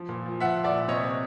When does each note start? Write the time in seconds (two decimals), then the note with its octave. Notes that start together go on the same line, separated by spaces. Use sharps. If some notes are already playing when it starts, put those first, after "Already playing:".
Already playing: F3
0.09 A#2
0.26 F3
0.40 F3 E5 F#5
0.56 A#2
0.64 D5 E5
0.72 A#2
0.88 C3 C#5 D#5
1.04 C3